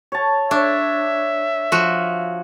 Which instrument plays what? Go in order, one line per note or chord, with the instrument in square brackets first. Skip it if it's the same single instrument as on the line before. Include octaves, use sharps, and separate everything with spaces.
[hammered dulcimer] C#5 A5
[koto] D4 [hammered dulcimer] C#5 [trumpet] E5
[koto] F3 F#4